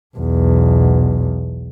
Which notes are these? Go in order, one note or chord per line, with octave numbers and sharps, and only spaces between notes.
B1 E2